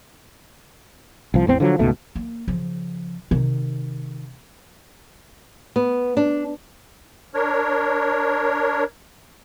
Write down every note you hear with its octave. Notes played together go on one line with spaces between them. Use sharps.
C2 F3
A1 E2 C4
D3 F3 F#3
C#2 G#2 B2 A3
A#3
C#3 F3
C3 D#3
B3
D4
D4 A#4 C#5